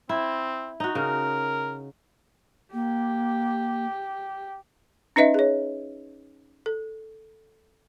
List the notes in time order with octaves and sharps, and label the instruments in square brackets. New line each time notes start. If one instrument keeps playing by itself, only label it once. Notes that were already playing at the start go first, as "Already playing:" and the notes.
[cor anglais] C4 [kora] E4
[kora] D#4 F#4
[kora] C#3 [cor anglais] A#4
[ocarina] A#3 [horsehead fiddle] G4
[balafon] C#4 D#4 B4 D#5 E5
G#4 C#5
A4